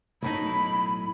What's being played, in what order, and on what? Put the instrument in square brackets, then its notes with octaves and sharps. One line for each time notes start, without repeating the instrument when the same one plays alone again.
[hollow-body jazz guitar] B1 A2 D#4 [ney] B5